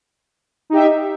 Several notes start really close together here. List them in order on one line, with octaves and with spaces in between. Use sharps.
D#4 G4 E5